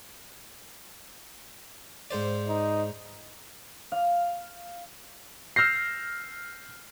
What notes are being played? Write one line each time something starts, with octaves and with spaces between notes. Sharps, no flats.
G#2 C5 D5
D#4
F5
E6 F6 G6 A#6 C7